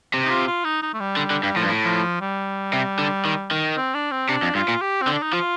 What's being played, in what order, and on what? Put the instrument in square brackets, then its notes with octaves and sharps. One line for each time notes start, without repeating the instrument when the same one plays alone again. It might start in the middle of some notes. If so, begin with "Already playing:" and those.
[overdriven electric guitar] C3
[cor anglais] D#4
F4
F4
D#4
D#4
A3
G3
[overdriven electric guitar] D3 [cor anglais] G3
[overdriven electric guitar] D3
[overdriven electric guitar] G2 [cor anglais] G3
[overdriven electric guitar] A2 [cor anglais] F3
[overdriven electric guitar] G2
A2
[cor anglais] F3
G3
[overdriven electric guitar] C3
D3
D#3
D#3
[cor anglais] C4
D4
C4
[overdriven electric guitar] C3 [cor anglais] D4
[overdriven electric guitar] F2
[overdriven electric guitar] G2 [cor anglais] F4
[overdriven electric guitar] A#2
[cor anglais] G4
C4
[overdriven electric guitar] D3
[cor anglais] D4
D#4
[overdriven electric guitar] F3 [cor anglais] F4